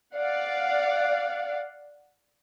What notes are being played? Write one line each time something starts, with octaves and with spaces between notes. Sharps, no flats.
D5 F5 F#5